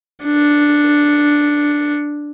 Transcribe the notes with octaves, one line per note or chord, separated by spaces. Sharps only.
D4 C#7